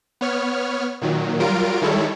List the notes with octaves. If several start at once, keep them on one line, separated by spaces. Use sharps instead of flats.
B3 C#5 F6
A#2 D#3 F#3
F#3 G3 F4 A#4 D7
D#3 G3 G#3 E4 A4 C#5